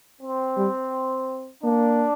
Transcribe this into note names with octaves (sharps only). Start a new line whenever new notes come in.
C4
G3
A#3 D4